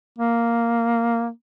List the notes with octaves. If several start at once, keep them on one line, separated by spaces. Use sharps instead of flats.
A#3